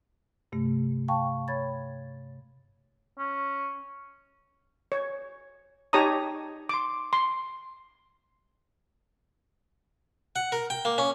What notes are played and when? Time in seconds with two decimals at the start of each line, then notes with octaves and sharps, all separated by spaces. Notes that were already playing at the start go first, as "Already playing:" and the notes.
0.52 G2 C3 A3
1.08 F5 G5 A5 C#6
1.48 C#5 B5 G#6 A6
3.19 C#4
4.92 C#5
5.93 D#4 G4 C#5 A5 A#5 D#6
6.69 C6 D6
7.13 C6
10.36 F#5
10.52 A#4
10.70 G5
10.85 A#3
10.98 C#4